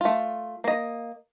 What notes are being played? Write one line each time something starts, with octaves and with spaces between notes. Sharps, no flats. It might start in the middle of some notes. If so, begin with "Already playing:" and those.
A3 F4
A#3 D#5